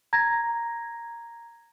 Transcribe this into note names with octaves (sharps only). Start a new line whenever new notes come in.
A#5 G#6 A#6